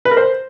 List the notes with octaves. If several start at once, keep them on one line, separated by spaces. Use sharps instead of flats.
B4
A#4
C5